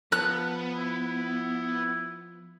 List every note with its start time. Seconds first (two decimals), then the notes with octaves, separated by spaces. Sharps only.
0.12 F3 B3 F#6
0.76 E4